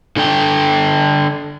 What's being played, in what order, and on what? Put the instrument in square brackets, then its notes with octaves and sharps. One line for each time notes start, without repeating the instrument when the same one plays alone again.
[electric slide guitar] D3 D4 A4 G5